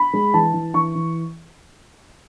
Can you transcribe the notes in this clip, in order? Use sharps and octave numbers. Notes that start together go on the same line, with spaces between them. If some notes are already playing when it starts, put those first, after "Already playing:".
Already playing: B5
G#3
E3 A5
E3
E3 C#6
E3